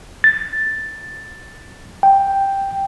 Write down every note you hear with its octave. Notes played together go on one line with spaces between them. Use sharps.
A6
G5